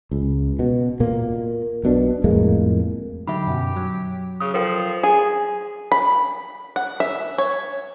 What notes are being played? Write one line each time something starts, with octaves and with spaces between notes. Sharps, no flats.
C#2
B2
A#2 A#3
B1 B2 D4
F2 A2 G#3 A#3
D3 F#3 D#4 G4 E5 B5
F#2 B2
F#3
C#3 D#6
F3 A4 A#4 G5
G#4
B5
F#5
E5
C#5